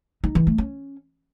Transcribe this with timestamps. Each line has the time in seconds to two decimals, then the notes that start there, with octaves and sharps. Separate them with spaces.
0.24 D#4
0.35 E3
0.47 A3
0.58 C#4